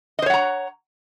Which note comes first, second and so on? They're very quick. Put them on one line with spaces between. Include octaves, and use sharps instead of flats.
D#5 C5 C#5 F#5 A#5